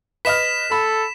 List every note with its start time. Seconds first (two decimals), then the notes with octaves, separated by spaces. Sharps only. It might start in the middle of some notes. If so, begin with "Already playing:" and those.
0.25 B4 D#5 F6 B6 E7
0.71 A4 B5